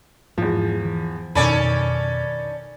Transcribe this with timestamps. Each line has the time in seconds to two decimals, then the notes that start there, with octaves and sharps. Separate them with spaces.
0.38 E2 G#2 F3
0.85 E3
1.35 F2 B2 D#3 C#4 A4 D5 G#5 B5